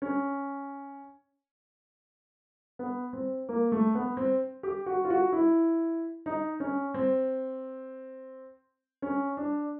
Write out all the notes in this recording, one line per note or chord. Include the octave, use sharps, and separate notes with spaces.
C#4
B3
C4
A#3
A3
B3
C4
G4
F#4
F4
F#4
E4
D#4
C#4
C4
C#4
D4